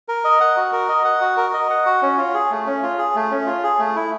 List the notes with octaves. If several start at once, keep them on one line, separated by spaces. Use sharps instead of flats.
A#4
D#5
F#5
F#4
A#4
D#5
F#5
F#4
A#4
D#5
F#5
F#4
C#4
F4
G#4
A3
C#4
F4
G#4
A3
C#4
F4
G#4
A3
E4